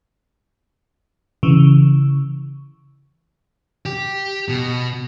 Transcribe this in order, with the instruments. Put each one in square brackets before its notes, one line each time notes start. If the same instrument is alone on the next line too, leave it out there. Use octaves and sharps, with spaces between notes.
[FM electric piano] C#3 E3
[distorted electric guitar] G4
B2